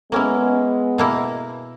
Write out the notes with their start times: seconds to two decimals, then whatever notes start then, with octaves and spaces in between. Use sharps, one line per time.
0.12 G#3 A#3 B3 C#4 E4
0.98 B2 A#3 E4